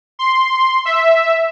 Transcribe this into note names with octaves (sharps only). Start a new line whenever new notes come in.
C6
E5